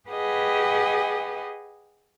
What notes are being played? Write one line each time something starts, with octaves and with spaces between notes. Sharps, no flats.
G4 G#4 B4 D#5 F#5 G#5